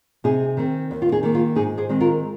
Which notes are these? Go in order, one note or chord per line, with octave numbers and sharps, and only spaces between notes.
C3 D#4 G#4
D#3 C4
D#2
F4
D#4 G#4
D#3 A#3
F4
G#2 D#4 G#4
G#4 C5
D#3 G#3 C4
F4 A#4